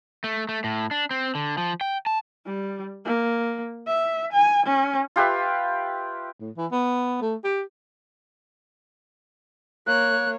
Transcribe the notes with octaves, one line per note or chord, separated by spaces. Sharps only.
A3
A3
A2
D4
C4
D3
F3
G5
A5
G3
A#3
E5
G#5
C#4
F4 G4 B4 E5
A2
E3
B3
A3
G4
A#3 C#5 F#6